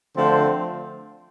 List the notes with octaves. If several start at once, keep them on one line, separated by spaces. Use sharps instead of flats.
D3 F3 A3 C4 C5